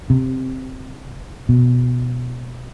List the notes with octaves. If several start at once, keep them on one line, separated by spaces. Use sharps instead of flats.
C3
B2